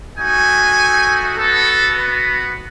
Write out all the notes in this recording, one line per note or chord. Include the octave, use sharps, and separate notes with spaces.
A3 D#4 F#4 G#5
B3 F#4 A4
B4